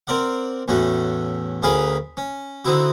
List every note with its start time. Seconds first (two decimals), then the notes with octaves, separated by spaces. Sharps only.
0.07 C4 A#4 D5 F#5
0.68 E2 A2 A3 C#4 F#4
1.62 D2 C#4 G#4 A#4 F5 B5
2.17 C#4
2.65 D3 C4 D#4 E4 F#4